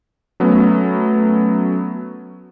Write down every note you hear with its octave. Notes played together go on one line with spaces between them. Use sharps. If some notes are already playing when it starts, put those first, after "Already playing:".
F#3 A3 B3 C#4